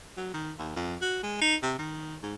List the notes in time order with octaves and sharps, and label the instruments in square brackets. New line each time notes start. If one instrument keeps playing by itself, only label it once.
[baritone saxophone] F#3
D#3
D#2
F2
F#4
G#3
D#4
C3
D#3
G#2